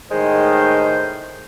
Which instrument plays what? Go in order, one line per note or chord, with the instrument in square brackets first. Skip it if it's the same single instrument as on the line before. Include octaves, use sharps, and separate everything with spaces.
[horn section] A2 D#3 [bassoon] G#3 [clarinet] C5